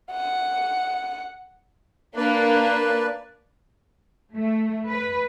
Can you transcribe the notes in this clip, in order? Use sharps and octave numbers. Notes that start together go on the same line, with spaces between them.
F#5
A#3 D4 B4 D5
A3
B4